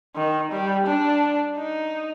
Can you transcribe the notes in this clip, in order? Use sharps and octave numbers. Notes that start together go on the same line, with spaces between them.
D#3
G3
D4
D#4